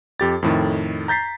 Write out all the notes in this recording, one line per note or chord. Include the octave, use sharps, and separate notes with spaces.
F2 G4 A6
F2 A2 D#3
A#5 G6 A6 B6 C7